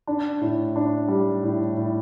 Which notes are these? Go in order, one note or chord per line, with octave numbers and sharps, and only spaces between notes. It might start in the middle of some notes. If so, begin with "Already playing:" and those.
D4
A2
D4
G3
A2
A2